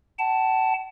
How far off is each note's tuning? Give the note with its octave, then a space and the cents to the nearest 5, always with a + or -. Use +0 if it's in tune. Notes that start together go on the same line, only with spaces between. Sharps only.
F#5 +40 A5 +0